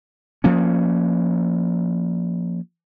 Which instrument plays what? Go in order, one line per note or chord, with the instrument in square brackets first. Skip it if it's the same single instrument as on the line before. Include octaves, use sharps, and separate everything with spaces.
[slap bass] F3 A#3 C#4